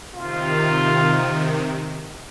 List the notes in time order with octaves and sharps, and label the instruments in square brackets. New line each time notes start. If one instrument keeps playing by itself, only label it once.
[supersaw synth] C3 D#3 [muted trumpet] F4